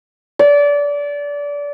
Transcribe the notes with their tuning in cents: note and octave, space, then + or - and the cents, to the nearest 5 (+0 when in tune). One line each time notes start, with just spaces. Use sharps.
D5 -25